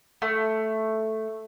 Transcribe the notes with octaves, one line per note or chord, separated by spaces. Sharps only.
A3